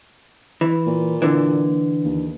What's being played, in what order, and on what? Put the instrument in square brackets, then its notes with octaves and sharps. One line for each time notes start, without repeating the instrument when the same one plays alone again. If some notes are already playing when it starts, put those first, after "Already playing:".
[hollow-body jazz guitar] E3
[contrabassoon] A#2
[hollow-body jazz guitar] D3 E3
[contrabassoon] D#2